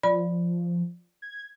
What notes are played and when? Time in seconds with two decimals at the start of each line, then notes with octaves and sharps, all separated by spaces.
0.03 F3 D5 B5
1.22 G#6